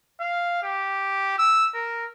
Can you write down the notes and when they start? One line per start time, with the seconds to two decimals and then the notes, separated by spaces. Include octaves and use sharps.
0.20 F5
0.63 G4
1.38 E6
1.74 A#4